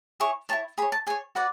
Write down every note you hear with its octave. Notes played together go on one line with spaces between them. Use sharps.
E4 G#4 C#5 C#6
E4 G#4 C#5 A5
G#4 C#5 B5
A5
G#4 C#5 G#5
F#4 B4 D5 F#5